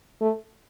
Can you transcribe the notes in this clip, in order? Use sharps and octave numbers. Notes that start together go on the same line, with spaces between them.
A3